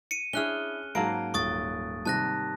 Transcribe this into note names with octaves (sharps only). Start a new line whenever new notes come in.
C#7 D#7
C#4 D4 E4 G#4 F6 F#6 G7
G#2 F#3 A#3 F5 A5 A#5 D7
D#1 C#6 D#6 A6
C3 D#3 G3 A5 F#6 A#6